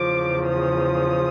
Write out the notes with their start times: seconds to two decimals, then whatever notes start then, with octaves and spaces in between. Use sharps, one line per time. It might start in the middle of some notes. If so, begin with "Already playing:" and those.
Already playing: E2 C#3 F3 D6
0.44 D#6